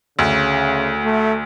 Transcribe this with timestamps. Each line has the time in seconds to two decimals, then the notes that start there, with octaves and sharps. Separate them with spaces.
0.19 D2 C#3
1.04 A3